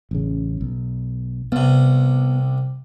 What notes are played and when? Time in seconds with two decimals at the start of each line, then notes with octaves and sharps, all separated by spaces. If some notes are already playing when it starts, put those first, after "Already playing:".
0.11 A1 C#3
0.61 B1
1.52 C2 C3 B3